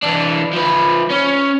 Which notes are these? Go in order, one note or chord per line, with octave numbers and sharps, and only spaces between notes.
E3 D4
F3 B4
C#4